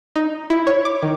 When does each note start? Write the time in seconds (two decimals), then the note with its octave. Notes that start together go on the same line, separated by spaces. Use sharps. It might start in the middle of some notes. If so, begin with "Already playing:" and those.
0.15 D#4
0.50 E4
0.67 C#5
0.85 D6
1.03 D#3